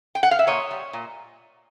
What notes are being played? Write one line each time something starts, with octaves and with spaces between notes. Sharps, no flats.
G5
F#5
F5
E5
A#2 C#5 D#5
G3
A#2